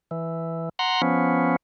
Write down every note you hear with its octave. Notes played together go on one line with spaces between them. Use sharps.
E3
F#5 A#5 C6
F3 B3 C#4